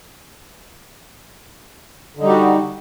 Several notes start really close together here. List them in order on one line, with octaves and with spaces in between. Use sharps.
D3 D#4 G3 G4 F#4